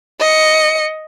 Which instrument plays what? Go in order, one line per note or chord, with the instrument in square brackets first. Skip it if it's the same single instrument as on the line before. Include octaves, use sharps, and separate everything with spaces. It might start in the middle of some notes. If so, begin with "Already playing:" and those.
[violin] D#5 C#7